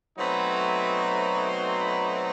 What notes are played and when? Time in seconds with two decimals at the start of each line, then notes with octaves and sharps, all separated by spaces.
0.17 B2 F#3 A3 C4 D#4 B5
0.82 B5
1.46 C6
1.78 B5